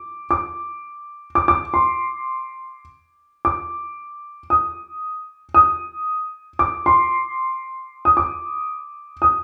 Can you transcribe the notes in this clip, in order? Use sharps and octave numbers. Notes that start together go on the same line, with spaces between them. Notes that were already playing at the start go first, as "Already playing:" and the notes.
Already playing: D6
D6
D6
D6
C6
D6
D#6
D#6
D6
C6
D#6
D6
D#6